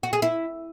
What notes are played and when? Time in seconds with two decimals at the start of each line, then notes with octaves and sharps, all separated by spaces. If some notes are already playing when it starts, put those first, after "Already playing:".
0.03 F#4
0.13 G#4
0.22 E4